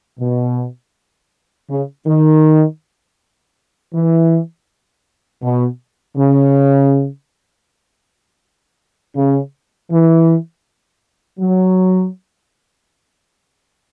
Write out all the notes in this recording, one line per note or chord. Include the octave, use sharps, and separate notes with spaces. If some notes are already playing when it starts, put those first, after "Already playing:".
B2
C#3
D#3
E3
B2
C#3
C#3
E3
F#3